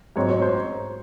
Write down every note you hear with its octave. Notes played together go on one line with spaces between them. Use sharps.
G#2 F#3 C4 C#5
C#5
C5